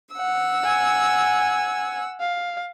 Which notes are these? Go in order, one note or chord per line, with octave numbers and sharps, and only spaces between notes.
F#5 E6
G#5
F5